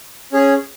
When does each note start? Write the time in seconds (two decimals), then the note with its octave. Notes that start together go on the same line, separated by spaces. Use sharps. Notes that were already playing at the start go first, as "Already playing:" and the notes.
0.32 C#4 G#4